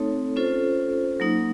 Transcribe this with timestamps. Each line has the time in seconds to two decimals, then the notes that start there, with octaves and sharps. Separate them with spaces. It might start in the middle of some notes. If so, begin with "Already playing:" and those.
Already playing: A3 C4 D#4 A4 C#5
0.36 C#4 F4 A4 C5
1.20 F#3 A#3 D#4